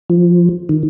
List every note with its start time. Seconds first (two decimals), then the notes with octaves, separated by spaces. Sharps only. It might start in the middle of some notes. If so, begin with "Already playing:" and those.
0.10 F3
0.69 D#3